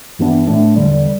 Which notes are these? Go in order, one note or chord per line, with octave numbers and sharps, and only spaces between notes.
G2 E3 B3 D4
A2 A3 D4
E2 D3 G3